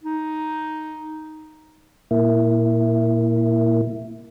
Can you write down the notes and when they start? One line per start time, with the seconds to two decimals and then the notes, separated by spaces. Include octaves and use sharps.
0.03 D#4
2.11 A#2 A#3 E4